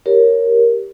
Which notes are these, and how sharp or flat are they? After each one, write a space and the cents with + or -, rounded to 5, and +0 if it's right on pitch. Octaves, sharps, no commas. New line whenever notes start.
G4 +0 A#4 +0 C#5 +0